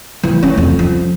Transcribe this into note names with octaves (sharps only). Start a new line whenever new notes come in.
E3
C#4
F2
F3